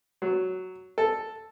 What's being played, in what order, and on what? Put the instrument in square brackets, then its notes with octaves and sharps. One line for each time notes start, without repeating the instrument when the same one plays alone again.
[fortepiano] F#3
A4